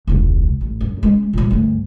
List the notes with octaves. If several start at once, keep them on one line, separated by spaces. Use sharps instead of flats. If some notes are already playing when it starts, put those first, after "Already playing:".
E1 C#2
A1
F#2
G#3 C#4
A#2 G3
D2 G2